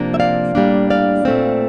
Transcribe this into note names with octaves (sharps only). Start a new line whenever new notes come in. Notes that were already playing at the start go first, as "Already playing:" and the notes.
Already playing: C3 F3 A#3 D4
E5
D5 F5
A2 G3 A#3 D4
D5 F5
A#2 A3 C4